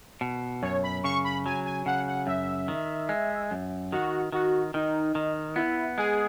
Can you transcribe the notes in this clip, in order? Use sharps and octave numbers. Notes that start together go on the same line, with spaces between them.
B2
F#2 C#5
B5
C#3 C#6
B5
F#3 G#5
G#5
C#3 F#5
F#5
F#2 E5
D#3
G#3
F#2
D#3 F#4
D#3 F#4
D#3 D#4
D#3
B3 E4
G#3 G#4